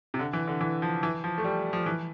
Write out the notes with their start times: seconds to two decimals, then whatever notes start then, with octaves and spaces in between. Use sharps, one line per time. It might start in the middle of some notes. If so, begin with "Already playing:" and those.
0.14 C3
0.19 D3
0.33 E3
0.48 D3
0.61 E3
0.82 F3
1.03 E3
1.24 F3
1.38 A3
1.44 G3
1.73 F3
1.86 E3